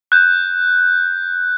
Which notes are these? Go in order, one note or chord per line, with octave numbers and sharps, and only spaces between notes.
F#6 G6